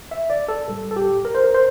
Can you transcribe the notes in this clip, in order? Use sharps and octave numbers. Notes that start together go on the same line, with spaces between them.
E5
D5
A4
A2 G3 A4
A4
G4
A#4
C5
A#4
C5